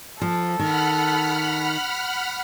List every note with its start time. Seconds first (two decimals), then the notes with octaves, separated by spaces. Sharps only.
0.21 F3 A4
0.59 D#3 F#5 B5 F6